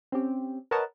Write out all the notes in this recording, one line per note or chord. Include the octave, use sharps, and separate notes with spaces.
C4 C#4 G4
A#4 B4 C#5 D#5 F#5 A5